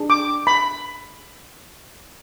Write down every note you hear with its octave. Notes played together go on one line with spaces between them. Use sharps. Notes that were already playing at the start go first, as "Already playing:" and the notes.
Already playing: D4 G#4
D6
B5